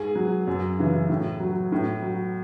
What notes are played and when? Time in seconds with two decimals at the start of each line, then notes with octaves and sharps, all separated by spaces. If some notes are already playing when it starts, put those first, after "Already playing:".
Already playing: G#2 G#4
0.16 F#3
0.48 F#2
0.79 C#3 E3
1.09 A2
1.40 F#3
1.72 A2
2.03 F#3